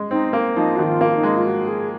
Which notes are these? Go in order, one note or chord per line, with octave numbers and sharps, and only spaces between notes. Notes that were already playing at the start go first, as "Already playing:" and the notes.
Already playing: G#3
C4 D#4
A#3
F3 D#4
D#3 F#4
F4
A#3
F4
D#4
G#3
F4
F#4
G#4